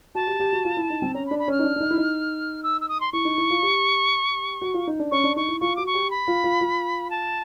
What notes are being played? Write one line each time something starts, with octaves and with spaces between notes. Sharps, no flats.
F#4 A5
G4
G4
F#4
F4
E4
D#4
C4
C#4 A#5
B5
D4
B5
C#4 F6
D#4
D4
D4
D#4
E4
D#4
E6
E6
D#6
C6
E4 C#6
D#4
E4
F4
G4
F#4
F4
D#4
D4
C#4 C#6
D4
D#4 C#6
E4
F4 C#6
F#4 D6
C#6
G4
B5
F4
F4
F4
A5